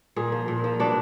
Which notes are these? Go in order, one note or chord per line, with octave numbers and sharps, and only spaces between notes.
A#2 G#4
F3
A#2
F3
B2 D4